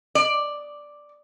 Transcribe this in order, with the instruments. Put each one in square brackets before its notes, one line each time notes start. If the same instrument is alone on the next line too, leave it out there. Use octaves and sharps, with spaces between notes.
[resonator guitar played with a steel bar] D5